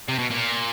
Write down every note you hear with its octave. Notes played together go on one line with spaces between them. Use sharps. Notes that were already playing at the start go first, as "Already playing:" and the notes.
C3
B2
A#2